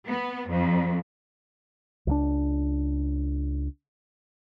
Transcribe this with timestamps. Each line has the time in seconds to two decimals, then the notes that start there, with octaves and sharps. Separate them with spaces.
0.11 B3
0.50 F2
2.07 C#2 F3 D4